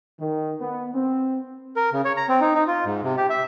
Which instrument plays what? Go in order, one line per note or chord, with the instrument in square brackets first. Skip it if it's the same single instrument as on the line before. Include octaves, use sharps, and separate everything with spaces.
[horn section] D#3
B3
C4
[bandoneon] A#4
C#3
C#5
A#5
C4
D#4
D#4
F4
G#2
C3
G4
E5